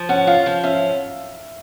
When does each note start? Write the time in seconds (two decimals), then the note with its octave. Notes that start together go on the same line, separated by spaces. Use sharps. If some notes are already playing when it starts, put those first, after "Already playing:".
Already playing: F3
0.09 C#4 F#5
0.27 F4 F5
0.46 F3
0.64 C#4 E5